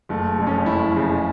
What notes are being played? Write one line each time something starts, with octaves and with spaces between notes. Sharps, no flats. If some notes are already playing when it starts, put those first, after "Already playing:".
F#1 A3
F2 C#3
C#4
F#1 E4
F2 C#3